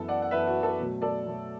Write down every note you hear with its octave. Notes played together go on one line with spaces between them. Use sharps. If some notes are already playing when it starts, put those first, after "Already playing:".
Already playing: F#2 E3 B3 A4
D5 F#5
F#5
F#2 E3 B3 B4 E5
F#4
A4
B2 F#3 A3
A4 D5
B2 F#3 A3